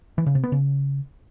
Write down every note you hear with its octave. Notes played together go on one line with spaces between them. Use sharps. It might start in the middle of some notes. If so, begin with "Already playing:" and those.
E3
C#3
C3
B3
C#3